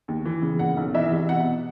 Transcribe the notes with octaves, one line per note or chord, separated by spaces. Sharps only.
D#2
E3
C#3
A#2 F#5
B1
E3 E5
C3
B2 F#5